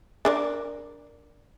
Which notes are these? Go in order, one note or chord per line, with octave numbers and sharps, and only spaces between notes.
D4 A#4 D5